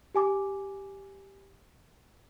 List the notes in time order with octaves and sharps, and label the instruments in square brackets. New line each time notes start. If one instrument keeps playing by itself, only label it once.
[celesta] G4 G#5 D6